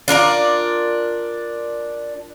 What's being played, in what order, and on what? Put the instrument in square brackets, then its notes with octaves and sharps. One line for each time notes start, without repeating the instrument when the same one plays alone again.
[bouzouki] D4 F4 A#4 D5